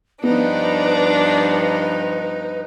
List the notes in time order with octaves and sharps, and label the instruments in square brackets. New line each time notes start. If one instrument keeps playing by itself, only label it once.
[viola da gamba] G2 F3 D#4 [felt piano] B3 [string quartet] D4 [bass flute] B4